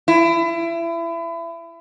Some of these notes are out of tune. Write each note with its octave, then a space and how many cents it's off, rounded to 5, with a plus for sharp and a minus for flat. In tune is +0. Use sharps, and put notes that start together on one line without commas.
E4 +30